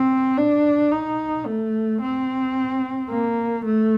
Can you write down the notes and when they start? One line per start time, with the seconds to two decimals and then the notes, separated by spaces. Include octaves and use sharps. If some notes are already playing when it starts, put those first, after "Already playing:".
Already playing: C4
0.37 D4
0.91 D#4
1.46 A3
2.01 C4
3.09 A#3
3.64 A3